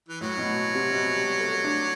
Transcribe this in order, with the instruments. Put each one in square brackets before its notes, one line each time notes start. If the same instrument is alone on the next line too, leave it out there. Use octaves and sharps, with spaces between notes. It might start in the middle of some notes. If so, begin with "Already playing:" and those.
[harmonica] E3
[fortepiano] A2 [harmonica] F#3
[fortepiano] B2
C3
B2
G3
A3
D4